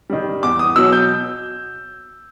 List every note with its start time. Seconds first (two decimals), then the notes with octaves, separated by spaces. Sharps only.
0.10 D#3 G3
0.43 E2 D6
0.59 D#6
0.76 B2 F#3 E6
0.93 G6